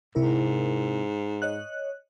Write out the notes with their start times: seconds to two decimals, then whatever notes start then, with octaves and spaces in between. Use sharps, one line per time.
0.15 G#2 C3 E4 A#4
1.42 C#5 D#5 F#6